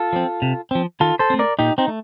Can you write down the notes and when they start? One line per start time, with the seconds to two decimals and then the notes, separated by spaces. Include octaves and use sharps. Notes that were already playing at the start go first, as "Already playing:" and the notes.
Already playing: F4 A4
0.13 F3 C4
0.42 C3
0.71 F3 C4
1.00 D#3 F4 A4
1.19 A4 C5
1.30 A3 C4
1.39 A#4 D5
1.59 A#2 D#4 G4
1.78 C4 D#4
1.88 A3